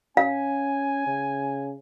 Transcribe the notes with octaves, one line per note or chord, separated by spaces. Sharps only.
C#4 F5 G#5
C#3